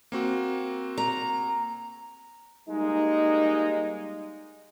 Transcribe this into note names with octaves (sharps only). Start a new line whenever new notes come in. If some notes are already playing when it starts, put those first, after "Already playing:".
A#3 C4 F#4
A#5
G3 G#3 A#3 D#4